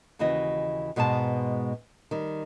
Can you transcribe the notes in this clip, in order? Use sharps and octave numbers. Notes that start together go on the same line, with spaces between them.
D#2 C#3 E3 F#4 D#5
G#2 B2 G#3 B3 A5
D#3 G3